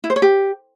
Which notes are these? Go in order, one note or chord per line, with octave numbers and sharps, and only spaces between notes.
E4
C5
C#5
G4